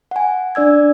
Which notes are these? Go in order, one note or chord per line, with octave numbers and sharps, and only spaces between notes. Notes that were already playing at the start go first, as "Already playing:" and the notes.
F#5 G#5
D4 D5 E6 G#6